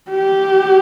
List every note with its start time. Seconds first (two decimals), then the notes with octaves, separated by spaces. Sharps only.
0.11 G4